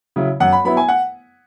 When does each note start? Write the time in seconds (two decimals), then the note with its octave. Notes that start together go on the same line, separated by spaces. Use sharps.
0.16 C#3 F#3 E4
0.40 F#2 F#5
0.52 B5
0.65 F#3 B3 E4 B5
0.77 G#5
0.88 F#5